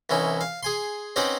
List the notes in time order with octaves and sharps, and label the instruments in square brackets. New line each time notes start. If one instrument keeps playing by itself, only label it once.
[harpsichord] C2 E3 C#4 D#4
F5
G#4 G#5 C6
C4 C#4 D#4 G4 B4 F#5